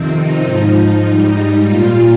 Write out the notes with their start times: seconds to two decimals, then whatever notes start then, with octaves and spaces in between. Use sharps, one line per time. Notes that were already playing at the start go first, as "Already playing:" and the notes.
Already playing: F2 C3 D#3 C4
0.16 D#4
0.45 G#2 F3
1.05 G#2 G3
1.65 A#2 G3 F4